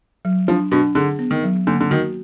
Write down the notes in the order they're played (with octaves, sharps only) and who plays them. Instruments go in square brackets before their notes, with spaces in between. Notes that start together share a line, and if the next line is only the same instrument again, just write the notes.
[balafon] F#3
[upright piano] F3 [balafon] D4
[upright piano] B2 [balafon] D4
[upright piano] D3 [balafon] G#4
[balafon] B3
[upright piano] D#3
[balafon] F#3
[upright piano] D3 [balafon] A#3
[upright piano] D3
[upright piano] D#3 [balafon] F#4